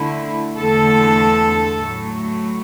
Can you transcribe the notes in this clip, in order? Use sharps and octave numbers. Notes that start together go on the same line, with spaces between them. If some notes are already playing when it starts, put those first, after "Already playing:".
Already playing: D3 A3 E4
E2 D3 A3 A4
A2 F#3 A3